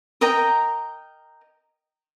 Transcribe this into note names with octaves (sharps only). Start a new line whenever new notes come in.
A#4 D#5 G5 A#5